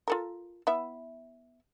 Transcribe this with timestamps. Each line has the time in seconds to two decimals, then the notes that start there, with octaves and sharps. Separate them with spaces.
0.08 F4 A4 A#4
0.67 B3 E4 E5